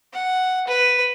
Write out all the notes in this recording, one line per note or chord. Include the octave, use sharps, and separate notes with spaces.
F#5
B4